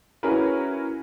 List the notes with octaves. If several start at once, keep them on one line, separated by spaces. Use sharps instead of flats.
C#4 E4 F#4 G#4 A#4 B4